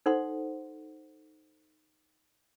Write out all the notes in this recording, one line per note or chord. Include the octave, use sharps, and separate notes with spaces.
D#4 A4 C5 F#5 C6